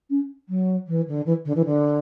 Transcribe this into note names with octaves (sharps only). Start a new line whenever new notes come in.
C#4
F#3
E3
D3
E3
D3
E3
D3